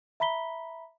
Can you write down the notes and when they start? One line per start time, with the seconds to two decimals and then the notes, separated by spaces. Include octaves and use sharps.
0.20 E5 A#5 B5 B6 G7